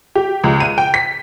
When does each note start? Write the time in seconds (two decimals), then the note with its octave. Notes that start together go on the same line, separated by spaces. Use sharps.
0.15 G4
0.44 C#2
0.60 D#7
0.78 G5
0.94 B6